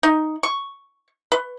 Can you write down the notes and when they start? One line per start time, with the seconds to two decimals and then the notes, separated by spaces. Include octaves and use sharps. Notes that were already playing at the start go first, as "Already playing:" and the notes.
0.03 D#4
0.43 C#6
1.32 B4